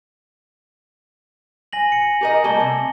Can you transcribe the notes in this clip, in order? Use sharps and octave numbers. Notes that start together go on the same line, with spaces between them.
G#5 A#6 F#7
C#7
G4 A#4 D#5
G3 A3 A#3 A5 G7
C3